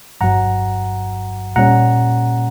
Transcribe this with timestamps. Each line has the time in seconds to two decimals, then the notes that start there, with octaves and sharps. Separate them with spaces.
0.21 G1 G2 F#3 F#5 A#5
1.56 A#2 G3 C#4 F#5 A#5